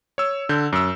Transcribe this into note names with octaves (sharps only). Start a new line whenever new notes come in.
C#5 E6
D3 G6
F#2 E6